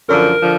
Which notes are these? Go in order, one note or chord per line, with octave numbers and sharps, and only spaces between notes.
F#2 D3 F3 A#4
D3 F3